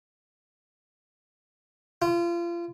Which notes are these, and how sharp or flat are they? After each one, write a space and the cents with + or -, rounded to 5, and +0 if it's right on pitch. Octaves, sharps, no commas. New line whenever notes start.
F4 -30